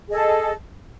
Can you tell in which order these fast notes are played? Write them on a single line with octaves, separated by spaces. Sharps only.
G#4 D#5 A4